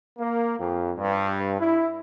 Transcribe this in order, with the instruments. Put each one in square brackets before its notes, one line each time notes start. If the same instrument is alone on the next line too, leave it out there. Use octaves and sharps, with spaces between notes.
[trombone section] A#3
F2
G2
E4